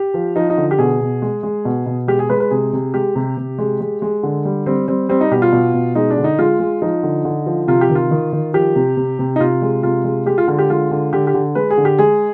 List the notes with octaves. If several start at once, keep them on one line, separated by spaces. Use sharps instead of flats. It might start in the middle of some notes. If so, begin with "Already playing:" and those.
Already playing: G4
F3
F3 D#4
D#4
D3
G4
B2 G#4
B2
G#3
G#3
B2
B2
G#3 G4
G#4
G#3 B4
B4
C3 G#4
C3
G#3 G4
C3
C3
G#3
G#3
G#3
D3
G3
G3 C4
G3 C4
G3 C4
D#4
B2 G4
F4
B2
B2
G#3 D#4
D4
D3
D#4
G#3 F4
G#3
F3 D#4
D3
D3
F3
C3 F4
G4
D#3
F4
D#3
D#3
F3 G4
C3
C3
C3
D#4
C3 F4
G#3
C3 F4
G#3
G#3 G4
F4
D3 F4
G4
G#3 F4
D3
D3 G4
G4
D3
G#3 B4
G#4
D3
G4
G#3 G#4